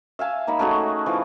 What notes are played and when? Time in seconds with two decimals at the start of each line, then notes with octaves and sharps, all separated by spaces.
0.19 E5 F5 G#5 A5
0.47 A#3 D#4 B5
0.59 A3 C#4 F#4 G#4
1.06 E3 F3